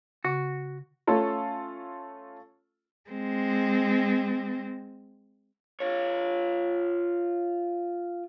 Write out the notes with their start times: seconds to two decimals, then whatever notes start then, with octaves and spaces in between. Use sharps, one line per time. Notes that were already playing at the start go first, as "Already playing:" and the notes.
0.24 C#3 F#4
1.07 A3 C#4 F4 A4
3.10 G#3 C4
5.80 F4 C#5